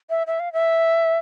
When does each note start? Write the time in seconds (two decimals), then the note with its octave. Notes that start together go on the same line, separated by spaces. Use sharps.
0.10 E5
0.27 E5
0.40 F5
0.53 E5